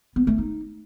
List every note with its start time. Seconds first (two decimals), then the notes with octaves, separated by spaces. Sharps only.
0.16 B3
0.27 A3
0.38 D#4